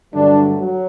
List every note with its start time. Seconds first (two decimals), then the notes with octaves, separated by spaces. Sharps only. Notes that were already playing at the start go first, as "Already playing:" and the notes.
0.14 G2 D3 F#3 A3 D4
0.59 F#3